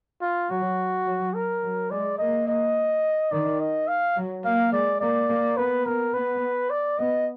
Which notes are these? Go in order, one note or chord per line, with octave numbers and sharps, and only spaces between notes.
F4
F#3 F#4
F#3
A#4
F#3
G#3 D5
A#3 D#5
D#5
D#3 D5
D#5
F5
F#3
A#3 F5
G#3 D5
A#3 D5
A#3
B3 B4
B3 A#4
B3 B4
D5
B3 D#5